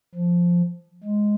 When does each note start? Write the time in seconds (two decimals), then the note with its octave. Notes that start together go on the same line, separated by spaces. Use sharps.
0.15 F3
1.04 G#3